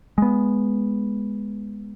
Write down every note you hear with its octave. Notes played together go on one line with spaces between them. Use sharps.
G#3 B3